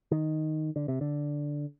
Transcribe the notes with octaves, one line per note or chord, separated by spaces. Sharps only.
D#3
D3
C3
D3